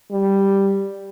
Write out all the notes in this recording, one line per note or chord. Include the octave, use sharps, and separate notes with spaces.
G3